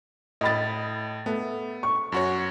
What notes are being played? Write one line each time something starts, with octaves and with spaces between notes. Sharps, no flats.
A2 D#5 B5 A6
A3 B3
C#6
F#2 F#4 C#5